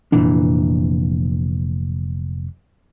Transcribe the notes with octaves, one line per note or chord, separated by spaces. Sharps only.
F1 A#2 E3 D4